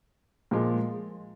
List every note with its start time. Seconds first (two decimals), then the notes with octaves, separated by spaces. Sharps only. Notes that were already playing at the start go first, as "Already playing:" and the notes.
0.51 A#2 F3 G#3